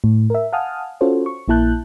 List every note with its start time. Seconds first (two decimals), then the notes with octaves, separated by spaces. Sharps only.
0.04 A2
0.30 A#4 E5
0.53 F5 F#5 G#5 A5 D#6 F6
1.01 C#4 F4 F#4 A4 C5 C#5
1.26 C#6
1.48 A#1 A#3 E4 A5 F#6 G6